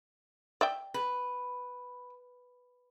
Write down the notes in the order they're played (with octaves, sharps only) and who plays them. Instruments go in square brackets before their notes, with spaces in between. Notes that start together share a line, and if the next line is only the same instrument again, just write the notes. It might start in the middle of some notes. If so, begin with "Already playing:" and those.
[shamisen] D5 E5 G5
[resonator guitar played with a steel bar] B4